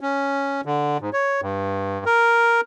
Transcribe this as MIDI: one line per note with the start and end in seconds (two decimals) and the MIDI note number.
0.01 0.61 61
0.65 0.98 50
1.01 1.10 44
1.13 1.41 73
1.42 2.04 43
2.06 2.61 70